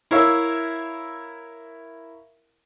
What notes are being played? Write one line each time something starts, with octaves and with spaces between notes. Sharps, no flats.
E4 A#4 C#5 E5 F5